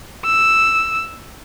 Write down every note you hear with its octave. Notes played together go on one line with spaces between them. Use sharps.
E6